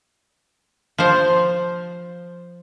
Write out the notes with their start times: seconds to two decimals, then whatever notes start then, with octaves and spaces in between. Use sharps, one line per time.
0.98 F3 C5